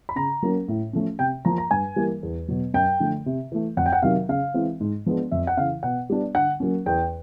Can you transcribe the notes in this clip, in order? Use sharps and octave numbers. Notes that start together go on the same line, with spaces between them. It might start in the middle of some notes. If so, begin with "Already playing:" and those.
B5
C#3 A#5
F#3 A#3 C#4
A2
F3 A3 C#4
C3 G5
F3 A#3 A#5
A#5
G2 G#5
E3 G3 A#3
E2
B2 F#3
F#2 G5
D3 F3 A3
C3
E3 A3
F2 F#5
G5
F#5
C3 D#3 F#3 F5
C#3 F5
E3 G#3 C4
G#2
F3 G#3 B3 D4
F2 E5
F#5
C#3 E3 F5
B2 F#5
G3 B3 D4
D3 F#5
F#3 A#3 C#4
E2 G5